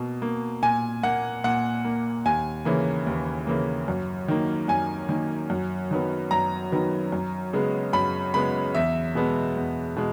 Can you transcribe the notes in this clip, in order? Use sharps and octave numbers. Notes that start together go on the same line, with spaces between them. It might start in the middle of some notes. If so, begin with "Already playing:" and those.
Already playing: B2 A#3
A#3
A#2 G#5
A#3 F#5
A#2 F#5
A#3
D#2 G#5
C#3 E3 A#3
D#2
C#3 E3 A#3
F#2
D#3 A#3
F#2 G#5
D#3 A#3
F#2
D#3 F#3 B3
F#2 A#5
D#3 F#3 B3
F#2
C#3 G#3 B3
F#2 B5
C#3 G#3 B3 B5
E2 E5
B2 G#3 B3
E2
B2 G#3